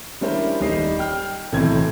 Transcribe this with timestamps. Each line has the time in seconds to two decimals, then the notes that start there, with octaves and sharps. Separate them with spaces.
0.21 G3 C#4 D4 E4 A#4 C5
0.60 D#1 G3 D#4 D#5 C7
0.99 G5 F6
1.52 B1 A2 C3 E3 C4 G#6